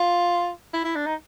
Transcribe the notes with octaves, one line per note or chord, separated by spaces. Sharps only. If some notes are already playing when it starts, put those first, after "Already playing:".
Already playing: F4
E4
E4
D4
D#4